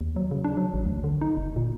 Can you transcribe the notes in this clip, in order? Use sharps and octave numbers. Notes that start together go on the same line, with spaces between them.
D#2
F#3
C#3
D4
F#3
A1
D2
D3
D#4
F#1
A#2